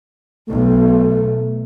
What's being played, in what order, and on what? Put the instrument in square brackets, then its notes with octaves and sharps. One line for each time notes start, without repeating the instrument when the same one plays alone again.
[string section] B1 [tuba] A3